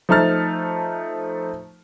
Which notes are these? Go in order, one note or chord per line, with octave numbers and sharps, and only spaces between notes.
F3 A3 D#4 A5 F6 A6